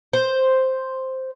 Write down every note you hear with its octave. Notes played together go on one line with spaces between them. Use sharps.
C5